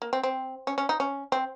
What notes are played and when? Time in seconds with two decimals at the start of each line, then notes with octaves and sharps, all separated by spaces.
0.02 A#3
0.13 C4
0.23 C4
0.67 C#4
0.78 C#4
0.89 D#4
1.00 C#4
1.32 C4